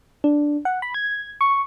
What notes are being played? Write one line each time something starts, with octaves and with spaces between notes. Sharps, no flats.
D4
F#5
B5
G#6
C#6